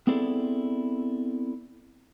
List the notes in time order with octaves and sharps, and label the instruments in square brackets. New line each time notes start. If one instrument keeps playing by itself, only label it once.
[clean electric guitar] B3 C4 E4 G#4 A4 D5